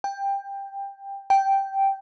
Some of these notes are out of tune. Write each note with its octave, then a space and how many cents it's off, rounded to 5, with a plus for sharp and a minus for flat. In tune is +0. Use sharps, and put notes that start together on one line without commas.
G5 +15
G5 -5